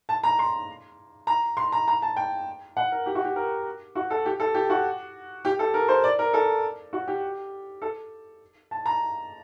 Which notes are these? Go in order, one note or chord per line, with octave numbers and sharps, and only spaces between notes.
A5
A#5
C6
A#5
C6
A#5
A#5
A5
G5
F#5
A#4
G4
F#4
G4
A#4
F#4
A4
G4
A4
G4
F#4
G4
A4
A#4
C5
D5
A#4
A4
F#4
G4
A4
A5
A#5